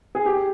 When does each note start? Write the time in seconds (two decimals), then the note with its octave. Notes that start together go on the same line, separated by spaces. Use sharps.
0.15 G#4
0.26 G4